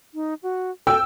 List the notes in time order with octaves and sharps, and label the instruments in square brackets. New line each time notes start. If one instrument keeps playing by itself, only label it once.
[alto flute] D#4
F#4
[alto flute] A4 [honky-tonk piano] G5 E6